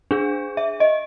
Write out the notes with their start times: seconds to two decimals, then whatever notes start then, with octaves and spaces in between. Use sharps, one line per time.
0.11 D4 G#4
0.57 E5
0.80 D#5